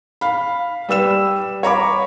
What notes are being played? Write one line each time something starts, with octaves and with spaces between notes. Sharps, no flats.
F5 B5
G3 B4 E6 E7
C#5 A#5 B5 D6